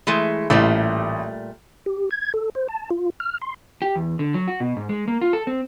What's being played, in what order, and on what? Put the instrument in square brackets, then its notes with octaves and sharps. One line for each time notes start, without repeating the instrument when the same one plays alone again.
[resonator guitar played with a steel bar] E3 G#3 A3
[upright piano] A1 [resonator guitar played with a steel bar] A#2 G3 A3
[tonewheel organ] G4
G#6
A4
C5
A5
F4
F6
C6
[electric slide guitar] G4
E2
D3
F#3
F#4
B2
G#2
G#3
A#3
F4
A4
C4